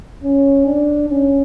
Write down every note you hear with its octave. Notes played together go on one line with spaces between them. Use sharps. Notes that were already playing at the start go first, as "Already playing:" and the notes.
C#4
D4
C#4